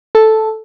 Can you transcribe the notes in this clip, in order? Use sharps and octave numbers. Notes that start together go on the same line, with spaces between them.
A4